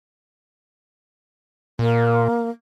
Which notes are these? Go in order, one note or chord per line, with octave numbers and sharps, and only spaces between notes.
A#2 A#3